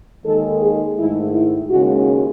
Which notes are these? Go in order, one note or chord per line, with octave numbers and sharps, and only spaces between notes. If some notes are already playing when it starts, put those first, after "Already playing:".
D#2 D#3 G#3 A4
G#4
G#2 D#3 A3 E4
E4
D#2 C#3 G#3 F#4